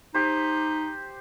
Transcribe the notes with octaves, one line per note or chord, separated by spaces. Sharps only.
D#4 G4 C5